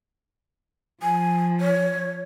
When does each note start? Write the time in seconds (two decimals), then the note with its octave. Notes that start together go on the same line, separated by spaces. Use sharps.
1.03 F3 G#5
1.61 C#5